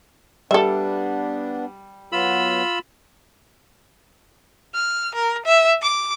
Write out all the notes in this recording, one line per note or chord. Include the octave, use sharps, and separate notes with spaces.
G3 B3 D4 A4 E5
F#3 B3 F4 B5 E6
F6
A#4
E5
D6